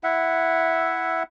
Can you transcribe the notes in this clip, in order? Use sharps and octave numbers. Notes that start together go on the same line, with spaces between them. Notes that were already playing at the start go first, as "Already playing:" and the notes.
E4 E5 F#5